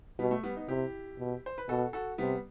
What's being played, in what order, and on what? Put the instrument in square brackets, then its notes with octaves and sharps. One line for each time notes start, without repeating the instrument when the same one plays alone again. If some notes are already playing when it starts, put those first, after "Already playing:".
[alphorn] B2 [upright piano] G3 B3
[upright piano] A3
G3 B3
B3 D#4
[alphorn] C3 [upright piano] E4 G4
[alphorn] B2
[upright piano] C5
B4
[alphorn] B2 [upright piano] F#4 A4
[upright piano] F#4 A4
[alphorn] C3 [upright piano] G3 B3